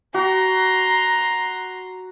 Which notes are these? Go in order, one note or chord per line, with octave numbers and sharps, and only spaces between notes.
F#4 A#5 C6